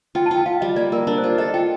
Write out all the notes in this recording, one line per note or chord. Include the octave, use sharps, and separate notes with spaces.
F4 G5
A5
F4 G5
F4 F5
G3 D#5
A#3 D5
A#3 A#4
D4 A#4
C5
F4
D5
A4 D#5
F4 G5